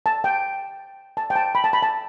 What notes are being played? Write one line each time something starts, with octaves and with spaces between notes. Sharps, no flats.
A5
G5
A5
G5
A5
B5
A5
B5
A5